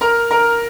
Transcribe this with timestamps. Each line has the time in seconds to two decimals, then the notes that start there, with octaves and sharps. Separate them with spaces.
0.01 A#4 A#5
0.31 A#4 A#5